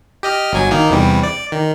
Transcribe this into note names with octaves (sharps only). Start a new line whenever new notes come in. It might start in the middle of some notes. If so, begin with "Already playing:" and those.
G4 D#5 F6
G1 F#3 G#5
D#3 A#3 D#4
E2 C3 G3
D5
D#3